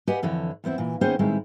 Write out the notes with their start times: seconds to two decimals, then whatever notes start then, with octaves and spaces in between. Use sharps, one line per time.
0.07 G4 B4 D5 D#5 F#5 G#5
0.23 F2 D3 E3 C#5
0.64 E2 B3 C4 E4
0.78 A#2 E3
1.01 D#2 B3 C#4 G#4 C5 G5
1.19 A2 D#3 G3 G#3 C4 E4